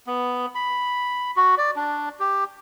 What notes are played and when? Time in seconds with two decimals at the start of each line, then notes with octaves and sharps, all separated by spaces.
0.07 B3
0.55 B5
1.37 F#4
1.58 D5
1.76 D4
2.20 G4